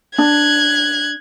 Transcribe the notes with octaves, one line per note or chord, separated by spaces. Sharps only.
D4 F#6 G#6